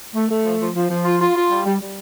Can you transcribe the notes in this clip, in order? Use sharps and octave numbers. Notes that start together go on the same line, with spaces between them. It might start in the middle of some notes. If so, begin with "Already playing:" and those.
A3
A3
F3
F3
F3
F3
F4
F4
F4
G3
G3
G3